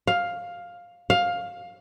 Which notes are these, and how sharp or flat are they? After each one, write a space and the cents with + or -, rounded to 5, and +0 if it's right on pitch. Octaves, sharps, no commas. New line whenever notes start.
F5 +10
F5 +15